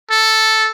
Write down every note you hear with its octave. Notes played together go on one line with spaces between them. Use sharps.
A4